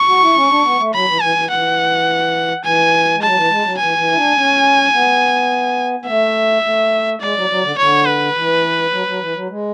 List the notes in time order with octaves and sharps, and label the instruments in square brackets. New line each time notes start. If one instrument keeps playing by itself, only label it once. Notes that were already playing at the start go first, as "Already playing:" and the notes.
Already playing: [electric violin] C#6
[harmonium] F#4
E4
C#4
D4
B3
A3
[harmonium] F#3 [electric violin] B5
[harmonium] E3
[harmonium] E3 [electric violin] G#5
[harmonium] E3
[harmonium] E3 [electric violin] F#5
[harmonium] E3 [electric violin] G#5
[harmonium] G#3
[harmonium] F#3 [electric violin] A5
[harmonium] E3
G#3
F#3
[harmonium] E3 [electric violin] G#5
[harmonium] E3
E4
D4
C#4
B3
B3
[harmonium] A3 [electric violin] E5
[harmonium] A3
[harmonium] G#3 [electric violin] D5
[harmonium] F#3
F#3
D3
[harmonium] D3 [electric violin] C#5
[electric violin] B4
[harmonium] E3
F#3
F#3
E3
F#3
G#3